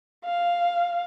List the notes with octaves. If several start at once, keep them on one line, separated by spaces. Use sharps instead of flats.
F5